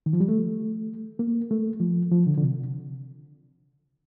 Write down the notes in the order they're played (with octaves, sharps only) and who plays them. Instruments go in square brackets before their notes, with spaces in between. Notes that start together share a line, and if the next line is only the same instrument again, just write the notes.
[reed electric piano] D#3
F3
G3
A3
A#3
A3
F3
F3
D3
D3
C3